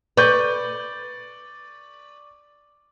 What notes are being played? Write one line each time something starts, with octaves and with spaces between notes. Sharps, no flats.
B4 D5 C#6 G6